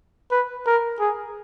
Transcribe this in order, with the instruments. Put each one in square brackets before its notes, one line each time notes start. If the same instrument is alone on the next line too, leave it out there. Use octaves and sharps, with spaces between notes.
[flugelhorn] B4
A#4
G#4